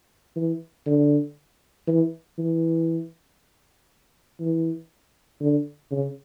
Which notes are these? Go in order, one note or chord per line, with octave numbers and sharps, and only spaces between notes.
E3
D3
E3
E3
E3
D3
C#3